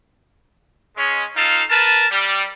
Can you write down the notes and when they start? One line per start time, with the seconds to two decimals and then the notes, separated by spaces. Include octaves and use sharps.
0.97 G#3 C#4
1.36 D#4 F4 A4 F5
1.70 A#4 B4 A5
2.11 G3